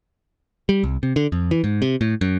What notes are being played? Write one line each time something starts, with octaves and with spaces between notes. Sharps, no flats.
G3
C2
C3
D3
F2
E3
G#2
C3
A2
F#2